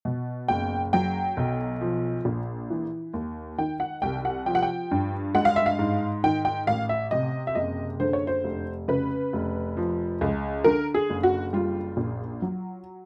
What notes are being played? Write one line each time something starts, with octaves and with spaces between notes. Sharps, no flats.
B2
F#1 G5
F#3 G5
B1
F3
A#1
E3
D#2
D#3 G5
F#5
C2 G5
F#5
F3 G5
F#5
G5
G2
G#3 F#5
F5
E5
F5
G#2
D#3 G5
G5
A1 F5
E5
C3 D#5
E5
F#1 D#5
D3 C5
C#5
C5
F1
C#3 B4
F1
F3
C#2
D3 A#4
G#4
F#1
F#4
G3 F4
A#1
F#3